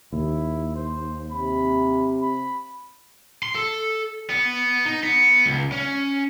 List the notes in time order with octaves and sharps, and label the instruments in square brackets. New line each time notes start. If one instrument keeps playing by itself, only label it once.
[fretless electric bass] D#2 [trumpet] E4
[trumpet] C5
[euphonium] C3 [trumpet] B5
[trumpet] B5
[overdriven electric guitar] C6
A4
B3
D#4
B3
C#2
C#4